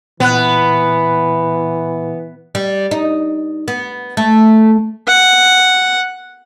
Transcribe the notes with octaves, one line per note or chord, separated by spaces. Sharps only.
A#2 E3 B3 F#6
G3
D#4
B3
A3
F#5